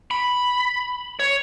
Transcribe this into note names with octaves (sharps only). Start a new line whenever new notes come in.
B5
C#5